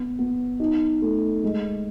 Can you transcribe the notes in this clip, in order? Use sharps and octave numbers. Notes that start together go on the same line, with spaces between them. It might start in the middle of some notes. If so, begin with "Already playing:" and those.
Already playing: B3
B3
D#4
A3
G#3